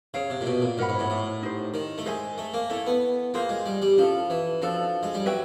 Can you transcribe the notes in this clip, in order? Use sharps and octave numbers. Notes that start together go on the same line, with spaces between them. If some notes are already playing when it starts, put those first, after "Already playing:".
C#3 G#4 C#5 F5
C3
A#2
B2
A#2
G#2 A#4 C#5 F#5 B5
G#2
A2
A2
D#4 G4 C5
D#3
A3
G#3 G#4 C5 E5 G#5
A3
A#3
A3 E4 A4 C#5
B3
A#3 F4 G#4 C5 F5
G#3
G3
G3
F3 C#4 E4 A4
E3
F3 D4 F#4 A4 D5
G#3
G3
F#3 B4 E5 G5